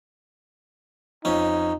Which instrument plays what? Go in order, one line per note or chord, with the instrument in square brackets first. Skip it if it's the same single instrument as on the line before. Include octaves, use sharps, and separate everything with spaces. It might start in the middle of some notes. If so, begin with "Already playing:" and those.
[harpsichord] F2 C#4 [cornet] D#4